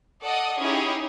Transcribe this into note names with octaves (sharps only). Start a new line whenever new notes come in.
A4 D5 D#5 F#5 D#6
C#4 D#4 E4 G4 G#4 C#5